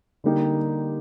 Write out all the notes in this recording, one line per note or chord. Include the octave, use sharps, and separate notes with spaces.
D3 G3 A#3 D#4 G4